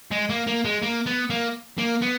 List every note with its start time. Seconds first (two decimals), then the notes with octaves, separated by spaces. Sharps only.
0.11 G#3
0.30 A#3
0.47 A#3
0.65 G#3
0.83 A#3
1.07 B3
1.30 A#3
1.78 A#3
2.02 B3